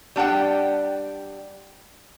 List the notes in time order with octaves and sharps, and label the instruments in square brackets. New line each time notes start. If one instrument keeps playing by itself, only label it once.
[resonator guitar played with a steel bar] G3 D4 F#5 G5